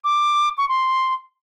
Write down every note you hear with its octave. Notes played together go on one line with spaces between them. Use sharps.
D6
C#6
C6